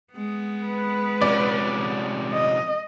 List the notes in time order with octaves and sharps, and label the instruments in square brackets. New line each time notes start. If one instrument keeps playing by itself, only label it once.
[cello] G#3 B3
[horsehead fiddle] B4
[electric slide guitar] C3 F3 C#4 [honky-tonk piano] D5
[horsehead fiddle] D#5